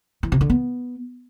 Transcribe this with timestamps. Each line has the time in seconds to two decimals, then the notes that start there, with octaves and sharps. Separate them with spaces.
0.23 E3
0.32 C3
0.41 D3
0.50 B3